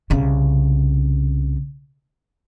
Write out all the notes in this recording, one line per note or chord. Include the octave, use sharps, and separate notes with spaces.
C2 C#3